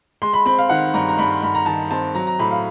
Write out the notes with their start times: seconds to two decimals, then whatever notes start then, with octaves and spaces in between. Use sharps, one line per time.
0.22 G#3 C6
0.33 B5
0.46 C4 B5
0.59 F5
0.69 D#3 F#5
0.94 G2 A#5
1.09 A#5
1.18 G2 B5
1.31 C6
1.42 G2 B5
1.55 A#5
1.66 D#3 A5
1.91 C4 A5
2.15 F#3 A#5
2.27 A#5
2.39 A2 B5
2.51 F5